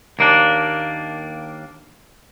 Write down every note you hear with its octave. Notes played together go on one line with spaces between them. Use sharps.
D#2 A#3 D4